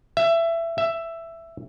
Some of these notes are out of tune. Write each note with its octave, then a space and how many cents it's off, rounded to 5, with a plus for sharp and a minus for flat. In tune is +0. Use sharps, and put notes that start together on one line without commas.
E5 +20
E5 +10